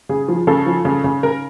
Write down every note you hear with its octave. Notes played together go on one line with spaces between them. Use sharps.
C#3 G#4
F3
C#3 A4
F3
C#3
C#3
C#3 A#4